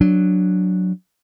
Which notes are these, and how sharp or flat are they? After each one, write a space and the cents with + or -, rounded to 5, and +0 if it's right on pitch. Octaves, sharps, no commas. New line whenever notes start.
F#3 -10 D4 +0